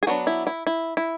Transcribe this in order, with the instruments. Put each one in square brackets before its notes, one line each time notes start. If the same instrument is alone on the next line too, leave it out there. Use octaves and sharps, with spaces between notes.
[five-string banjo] G#4
F#3 B3 D4 F#4
E4
E4
E4
E4